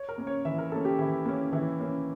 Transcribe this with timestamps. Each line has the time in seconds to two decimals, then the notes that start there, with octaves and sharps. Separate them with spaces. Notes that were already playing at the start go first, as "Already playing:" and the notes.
Already playing: C#5
0.09 A#4
0.18 A#3 C#4
0.27 C#5
0.45 E3 E5
0.58 A#4
0.72 A#3 C#4 A4
0.85 G4
0.99 E3 E4
1.26 A#3 C#4
1.52 E3 E4
1.80 A#3 C#4